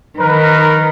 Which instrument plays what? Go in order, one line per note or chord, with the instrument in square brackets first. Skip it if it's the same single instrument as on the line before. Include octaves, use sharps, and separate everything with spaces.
[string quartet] D#3 [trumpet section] A#4 B4